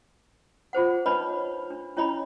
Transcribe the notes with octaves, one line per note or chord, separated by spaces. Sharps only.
F4 G#4 C5 F#5
D4 D#4 B4 C#5 D#5 B5
D4
C#4 E4 C#5 D#5 A#5 B5